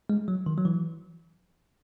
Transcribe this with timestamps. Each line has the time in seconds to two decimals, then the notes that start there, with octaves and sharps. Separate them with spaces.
0.10 G#3
0.28 F#3
0.46 D#3
0.58 F#3
0.65 E3